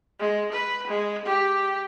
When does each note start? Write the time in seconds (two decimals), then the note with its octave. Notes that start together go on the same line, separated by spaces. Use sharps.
0.19 G#3
0.52 B4
0.88 G#3
1.26 G4